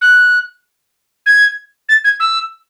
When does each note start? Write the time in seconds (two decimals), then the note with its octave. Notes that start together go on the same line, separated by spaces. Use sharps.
0.01 F#6
1.26 G#6
1.89 A6
2.04 G#6
2.20 E6